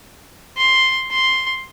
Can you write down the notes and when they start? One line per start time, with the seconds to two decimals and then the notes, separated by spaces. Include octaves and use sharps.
0.57 C6
1.11 C6